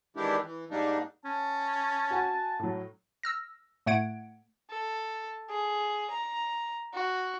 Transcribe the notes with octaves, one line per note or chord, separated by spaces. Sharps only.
D#3 E3 G#3 D4 E4 G4
E3
G#2 G3 A#3 D4 D#4
C#4 A5
F#4 G#5
A2 F#3
E6 F6 A#6
A2 A3 F#5 G#6 D7
A4
G#4
A#5
F#4